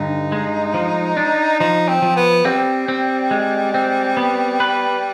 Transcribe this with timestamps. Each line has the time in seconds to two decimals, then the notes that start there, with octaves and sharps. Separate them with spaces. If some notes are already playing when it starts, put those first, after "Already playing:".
Already playing: G2 D3 D#4
0.32 G#3
0.74 F3
1.17 D4
1.60 F3 D#4
1.89 C4
2.02 F3
2.17 B3
2.45 G3 C4
2.88 C4
3.31 G#3
3.74 C4
4.17 B3
4.60 B4